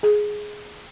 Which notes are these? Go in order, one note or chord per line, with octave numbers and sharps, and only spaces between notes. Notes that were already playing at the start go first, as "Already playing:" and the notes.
G#4